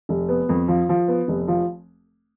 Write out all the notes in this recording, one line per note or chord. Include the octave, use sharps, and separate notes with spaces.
F1
B3
F2
F3
F3
B3
F1
F3